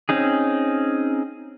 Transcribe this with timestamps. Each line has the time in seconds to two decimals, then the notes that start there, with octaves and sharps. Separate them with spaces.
0.09 C4 C#4 D#4 G#4